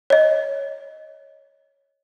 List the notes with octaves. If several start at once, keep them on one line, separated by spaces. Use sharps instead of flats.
C#5 D#5